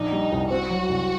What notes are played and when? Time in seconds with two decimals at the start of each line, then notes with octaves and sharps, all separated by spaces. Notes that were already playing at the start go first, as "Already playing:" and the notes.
Already playing: A#1 D4 D#4
0.12 G3
0.32 C2
0.50 C4 F#4
0.70 F#3
0.89 C2